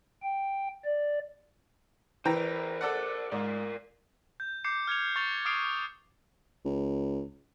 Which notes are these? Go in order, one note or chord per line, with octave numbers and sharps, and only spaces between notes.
G5
D5
E3 A#4 C5 G5 A#5
A4 D5 F#5
G#2 A#4 D5
G6
D6 G6 C7 C#7
F6 G#6 C#7 F7
C#6 A6 C#7 F7 G7
D6 D#6 F6 C7 D7
C#2